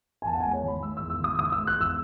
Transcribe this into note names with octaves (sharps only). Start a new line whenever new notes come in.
G#5
E2 A5
F#5
G#3 G#5
C#5
D#3 B5
G#3 E6
E2 E6
E6
D#3 D#6
D#3 D#6
G#3 E6
F#6
E2 E6